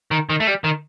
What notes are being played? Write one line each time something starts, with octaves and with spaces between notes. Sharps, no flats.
D#3
D#3
A3
G3
D#3